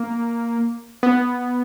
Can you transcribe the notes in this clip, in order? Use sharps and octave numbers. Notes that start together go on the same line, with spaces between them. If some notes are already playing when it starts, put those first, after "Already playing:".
Already playing: A#3
B3